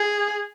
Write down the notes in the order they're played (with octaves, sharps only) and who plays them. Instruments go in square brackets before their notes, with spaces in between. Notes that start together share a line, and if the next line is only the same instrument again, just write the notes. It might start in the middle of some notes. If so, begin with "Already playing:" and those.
Already playing: [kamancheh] G#4